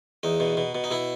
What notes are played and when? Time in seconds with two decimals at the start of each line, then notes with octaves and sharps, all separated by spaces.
0.23 E2 D#4
0.40 B2
0.57 B2
0.75 B2
0.84 D#4
0.91 B2 E4